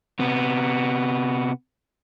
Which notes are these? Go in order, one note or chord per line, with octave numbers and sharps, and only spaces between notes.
C3 B3